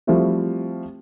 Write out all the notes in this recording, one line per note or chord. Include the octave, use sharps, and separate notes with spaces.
F3 G3 A3 C4 E4 F#4